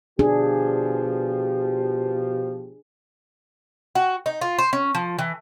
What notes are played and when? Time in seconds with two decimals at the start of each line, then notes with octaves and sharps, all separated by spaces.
0.19 B2 F3 D4 G4 G#4
3.95 F#4
4.26 D#4
4.41 F4
4.58 C5
4.73 C#4
4.95 F3
5.19 E3